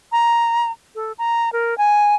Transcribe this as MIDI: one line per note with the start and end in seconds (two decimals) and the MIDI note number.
0.12 0.72 82
0.95 1.12 69
1.18 1.52 82
1.53 1.77 70
1.78 2.15 80